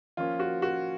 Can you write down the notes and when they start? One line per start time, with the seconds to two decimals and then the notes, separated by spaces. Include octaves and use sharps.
0.17 F3 A#3 C#4 F4
0.40 F#4
0.62 F#4